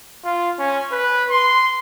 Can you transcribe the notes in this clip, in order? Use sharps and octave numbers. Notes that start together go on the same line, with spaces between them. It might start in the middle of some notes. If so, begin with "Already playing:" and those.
F4
C#4
B4
C6